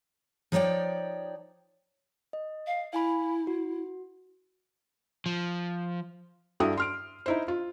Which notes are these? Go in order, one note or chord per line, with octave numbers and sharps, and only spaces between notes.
F3 D#4 C#5 D5 G5
D#5
F5
E4 F5 G#5 B5
F#4
F3
G2 E4 F#4 A4 G5 D#6
C6 F6 D7
D#4 E4 C5
F4